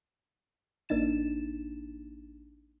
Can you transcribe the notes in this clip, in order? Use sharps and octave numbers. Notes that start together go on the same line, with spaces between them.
A1 A#3 D4 D#4 A6 E7